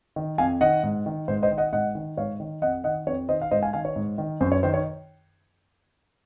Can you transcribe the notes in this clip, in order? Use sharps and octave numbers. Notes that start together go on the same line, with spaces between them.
D#3
F2 F5 G#5
D#3 D#5 F#5
G#2
D#3
G#2 C5
C5 D#5
D#3
D#5 F#5
G#2 D#5 F#5
D#3
G#2 C#5 F5
D#3
F2 D#5 F#5
D#3 D#5 F#5
F2 C#5
D#3 C5 D#5
F5
G#2 C5 D#5
F5 G#5
D#3 F5 G#5
C#5
G#2
D#3
F#2 C5
C#5
D#3 C5
C#5